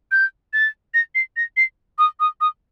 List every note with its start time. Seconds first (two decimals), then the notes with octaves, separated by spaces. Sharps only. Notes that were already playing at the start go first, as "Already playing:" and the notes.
0.12 G6
0.53 A6
0.94 A#6
1.15 C7
1.37 A#6
1.57 C7
1.98 D#6
2.20 D#6
2.41 D#6